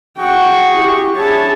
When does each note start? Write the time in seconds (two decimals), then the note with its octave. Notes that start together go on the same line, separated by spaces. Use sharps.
0.18 F#4 G#4 F#5 G5 C#6
0.72 E4 G4
1.16 D4 E4 G#4 C#5 A5